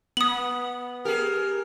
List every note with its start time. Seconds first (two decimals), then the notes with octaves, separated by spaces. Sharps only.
0.17 B3 D#6 F#7
1.05 G4 G#4 A#4